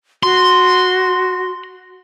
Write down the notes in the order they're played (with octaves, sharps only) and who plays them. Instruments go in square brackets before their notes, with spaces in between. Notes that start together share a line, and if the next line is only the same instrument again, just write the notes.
[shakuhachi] F#4 [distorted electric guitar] C6